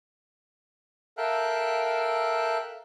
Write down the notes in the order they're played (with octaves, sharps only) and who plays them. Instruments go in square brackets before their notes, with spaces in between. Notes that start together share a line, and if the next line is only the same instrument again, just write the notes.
[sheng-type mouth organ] A4 A#4 E5 F5 G5 F#6